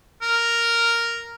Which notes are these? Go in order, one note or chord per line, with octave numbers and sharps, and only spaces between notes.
A#4